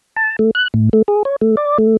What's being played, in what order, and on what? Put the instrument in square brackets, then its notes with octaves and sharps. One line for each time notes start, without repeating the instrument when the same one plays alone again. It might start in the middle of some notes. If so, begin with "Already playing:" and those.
[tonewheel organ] A5
A3
F#6
A2
A3
G#4
C#5
A3
D5
A3